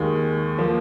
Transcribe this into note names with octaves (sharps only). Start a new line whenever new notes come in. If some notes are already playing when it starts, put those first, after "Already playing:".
Already playing: D#2 D#3 G#3
F3 A#3